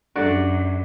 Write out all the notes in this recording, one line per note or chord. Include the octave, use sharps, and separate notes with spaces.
F#2 D4 F#4 G4 A4 D5